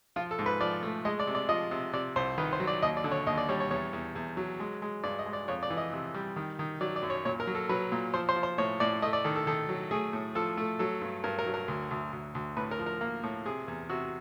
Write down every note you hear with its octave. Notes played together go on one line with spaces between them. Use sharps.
F3 F4
A4
G#2
B4
F3 D5
A3
G#3 D#5
D5
C3
D5
F3 D#5
C3
C3 D5
C2 C5
D#3 B4
C5
F#3
D5
D#2 D#5
D5
D3
C#5
D#2 D#5
D5
G3 C#5
C#5
E2 C#5
E2
E2
F#3
G#3
G#3
G2 D5
D#5
G#3
D5
F2 C#5
D5
E3
D#5
C3
G3
D#3
D#3
F#3 D5
D5
F#2
C#5
A#2 C#5
A#4
F#3
A4
F#3 B4
A#2
F3 C5
C5
F3
C5
A2 C#5
A2 D5
A3 D#5
D5
D#3 A4
A4
D#3 A4
F#3
A3 G#4
A2
F3 A4
A3
F#3 A4
G2
G2 A#4
A#4
F#3
A#4
D2
D2
D2
D2
A2 B4
A#4
F3
A#4
A#3
A2
C3 G#4
E2
C3 F#4